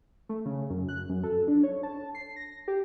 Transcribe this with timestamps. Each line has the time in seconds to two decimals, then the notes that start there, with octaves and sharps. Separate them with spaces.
0.29 A3
0.46 C#3
0.70 F#2
0.89 F#6
1.09 F#2
1.24 A4
1.48 D4
1.63 C#5
1.83 A5
2.15 C7
2.36 A#6
2.68 G4